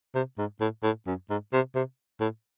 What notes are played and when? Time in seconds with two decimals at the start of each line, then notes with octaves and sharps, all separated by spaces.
0.15 C3
0.38 G#2
0.61 A2
0.83 A2
1.07 F#2
1.30 G#2
1.53 C3
1.75 C3
2.20 A2